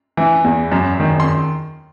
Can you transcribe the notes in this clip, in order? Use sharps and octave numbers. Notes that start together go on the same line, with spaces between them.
E3
E2
F#2
D#3
C6